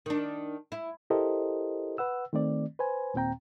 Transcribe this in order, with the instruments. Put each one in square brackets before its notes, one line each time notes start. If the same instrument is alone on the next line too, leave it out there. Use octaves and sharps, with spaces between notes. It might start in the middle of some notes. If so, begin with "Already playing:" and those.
[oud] D#3 D4
E4
[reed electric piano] E4 G4 A4 A#4 C5 D#5
B4 F#5 E6
D#3 A3 C4 D5
B4 C5 G#5
D#2 A#2 C4 G5 A#5